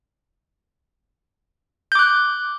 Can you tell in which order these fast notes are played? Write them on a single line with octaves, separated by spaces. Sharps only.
G6 D6 F#6